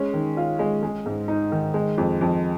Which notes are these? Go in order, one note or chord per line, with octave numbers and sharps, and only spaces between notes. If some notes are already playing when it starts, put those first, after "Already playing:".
Already playing: G#3 C#4
D#3
F4
G#3
G#3
G#2
D#4
D#3
G#3
F2
F2